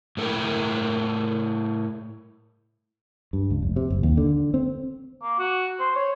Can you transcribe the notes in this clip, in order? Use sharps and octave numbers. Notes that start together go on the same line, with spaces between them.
A2 A4 A#4 G5
G2
C#2
F1
C3
F#1
D#2
D3
C4
A#3
F#4
C5
C#5